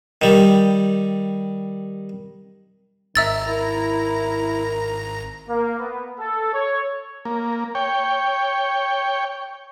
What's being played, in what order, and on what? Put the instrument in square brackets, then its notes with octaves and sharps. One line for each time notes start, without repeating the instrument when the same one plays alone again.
[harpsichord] D#3 G3
[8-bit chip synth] G#1 A#5 [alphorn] D#3 [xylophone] E5 E6 A6
[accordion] E4 [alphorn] A#4
[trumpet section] A#3
B3
A4
C#5
[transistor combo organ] A#3
C#5 G5